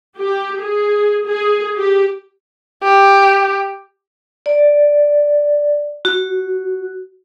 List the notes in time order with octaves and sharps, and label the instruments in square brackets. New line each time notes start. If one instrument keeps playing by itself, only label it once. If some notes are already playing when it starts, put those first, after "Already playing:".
[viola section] G4
G#4
G#4
G4
[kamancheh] G4
[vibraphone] D5
F#4